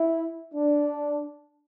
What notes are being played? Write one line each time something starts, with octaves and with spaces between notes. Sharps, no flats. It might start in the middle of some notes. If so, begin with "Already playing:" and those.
Already playing: E4
D4